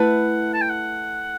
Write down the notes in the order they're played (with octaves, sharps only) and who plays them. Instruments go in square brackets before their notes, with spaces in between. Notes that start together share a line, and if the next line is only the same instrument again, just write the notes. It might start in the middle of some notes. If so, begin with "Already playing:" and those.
Already playing: [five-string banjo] A3 E4 B4 [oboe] F#5
[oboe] A5
G5
F#5